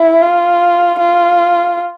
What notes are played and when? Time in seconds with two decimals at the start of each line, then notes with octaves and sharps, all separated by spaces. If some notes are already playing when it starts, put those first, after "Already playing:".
Already playing: E4
0.21 F4
0.99 F4